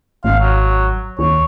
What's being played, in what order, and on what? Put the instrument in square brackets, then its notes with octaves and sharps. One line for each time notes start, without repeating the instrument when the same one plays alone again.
[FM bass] G#1 [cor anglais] F5
[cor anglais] F#3
[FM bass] D#2 [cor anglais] C#5